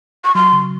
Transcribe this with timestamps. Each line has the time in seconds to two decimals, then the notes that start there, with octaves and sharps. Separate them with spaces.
0.25 C#6
0.35 F#3 C6
0.52 C#3